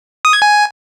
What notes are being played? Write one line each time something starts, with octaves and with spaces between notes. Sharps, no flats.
D#6
G#6
G#5